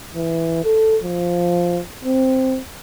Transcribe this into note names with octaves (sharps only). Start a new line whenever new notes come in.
E3
A4
F3
C4